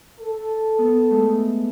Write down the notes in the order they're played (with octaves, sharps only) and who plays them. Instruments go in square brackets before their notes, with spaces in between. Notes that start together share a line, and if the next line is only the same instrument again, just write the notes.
[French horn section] A4
[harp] B3
G#3 A3